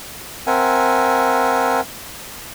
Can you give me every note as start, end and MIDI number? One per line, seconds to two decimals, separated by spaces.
0.47 1.80 60
0.47 1.80 70
0.47 1.80 76
0.47 1.80 78
0.47 1.80 80